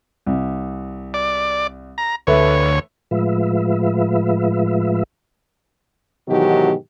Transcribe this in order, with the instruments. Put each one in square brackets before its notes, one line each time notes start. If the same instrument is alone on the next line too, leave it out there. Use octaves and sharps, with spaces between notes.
[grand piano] C2
[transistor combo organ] D5
A#5
[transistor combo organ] D2 C#5 [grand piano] A3 B4 E5
[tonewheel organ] A2 F3 G#3 F4 B4 E5
[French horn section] G#2 B2 D#3 E3 F#3 G4